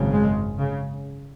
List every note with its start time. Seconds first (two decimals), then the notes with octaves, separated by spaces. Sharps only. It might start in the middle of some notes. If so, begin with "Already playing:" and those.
Already playing: G#1 F#2 C#3
0.12 G#3
0.60 C#3